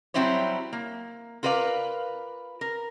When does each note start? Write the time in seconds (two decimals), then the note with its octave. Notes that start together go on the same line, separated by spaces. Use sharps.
0.14 F#3 G3 C4 E4 C5 C#5
0.73 A#3
1.43 F4 A#4 B4 D5 F5
2.61 A#4